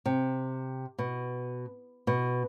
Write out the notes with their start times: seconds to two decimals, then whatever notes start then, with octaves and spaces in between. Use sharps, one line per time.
0.06 C3
0.99 B2
2.07 B2